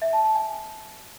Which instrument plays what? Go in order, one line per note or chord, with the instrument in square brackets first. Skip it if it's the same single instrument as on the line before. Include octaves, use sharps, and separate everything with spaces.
[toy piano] E5
A5
A5
G#5